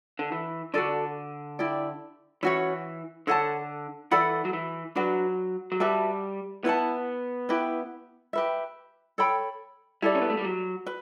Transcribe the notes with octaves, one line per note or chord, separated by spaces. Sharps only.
D3
E3
D3 F#4 A4 D5
E4 G4 D5
E3 C#4 F#4 C#5
D3 A4 C#5 F#5 A5
E3 A4 D5 F#5 B5
F#3
E3
F#3 D4 F#4 B4
F#3
G3 F#4 B4 E5 A5
B3 E4 B4 F#5 A5
E4 G4 B4
G4 B4 E5
A4 C#5 G5 B5
G3 E4 A4 D5
C#4
B3
A3
G3
F#3
B4